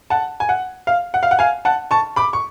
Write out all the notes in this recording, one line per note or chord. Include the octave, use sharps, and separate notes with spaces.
F#5 A5
G#5
F#5
F5
F#5
F5
F#5
F5 G#5
F#5 A5
A5 C#6
B5 D6
C#6